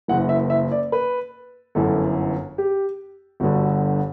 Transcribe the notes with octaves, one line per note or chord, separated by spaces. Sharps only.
F#1 F#2 E3 F#5
E5
E5
D5
B4
G1 F#2 E3 A4
G4
G1 G2 D3 F#4